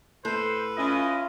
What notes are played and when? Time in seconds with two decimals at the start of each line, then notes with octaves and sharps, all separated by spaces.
0.25 A2 A4 B4 C5
0.77 C#4 E4 F4 D#5